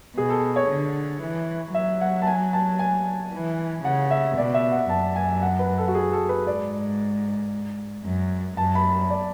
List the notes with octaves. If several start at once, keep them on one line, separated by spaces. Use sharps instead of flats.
B2 G#4
A4
C#5
D3
E3
F#3 E5
F#5
A5
G#5
A5
G#5
E3
C#3 F#5
E5
B2 D5
E5
F#5
F#2 A5
G#5
F#5
B4
A4
F#4
G#4
A4
B4
G#2 D5
F#2
F#2 A5
B5
D5